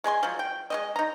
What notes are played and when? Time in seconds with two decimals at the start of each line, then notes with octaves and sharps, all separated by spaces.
0.04 G#3 G#4 G#5 C6
0.23 F3 F#3
0.39 G5
0.70 G#3 C4 D#5
0.96 D#4 A#5